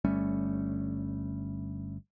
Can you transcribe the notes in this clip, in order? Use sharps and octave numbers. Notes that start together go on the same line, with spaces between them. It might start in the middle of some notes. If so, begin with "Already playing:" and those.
G1 G3 A3 C#4